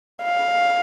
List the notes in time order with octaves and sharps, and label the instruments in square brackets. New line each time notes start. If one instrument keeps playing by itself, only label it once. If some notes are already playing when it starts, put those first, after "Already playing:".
[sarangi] F5